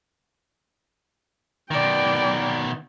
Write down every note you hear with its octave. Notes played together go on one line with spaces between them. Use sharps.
B2 D#3 D5 G5